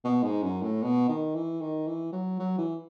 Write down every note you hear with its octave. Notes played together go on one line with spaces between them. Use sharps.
B2
G#2
F#2
A2
B2
D#3
E3
D#3
E3
F#3
F#3
E3